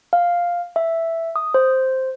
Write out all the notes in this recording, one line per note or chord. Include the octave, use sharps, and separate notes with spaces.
F5
E5
D#6
C5